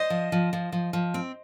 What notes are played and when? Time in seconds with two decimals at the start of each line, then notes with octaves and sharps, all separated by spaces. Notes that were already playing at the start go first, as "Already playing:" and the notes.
Already playing: C5 D#5
0.10 F3
0.32 F3
0.53 F3
0.72 F3
0.93 F3
1.14 C4